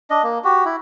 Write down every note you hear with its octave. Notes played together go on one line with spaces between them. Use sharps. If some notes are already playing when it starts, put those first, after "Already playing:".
D4 D#5
A#3
F#4 G4
E4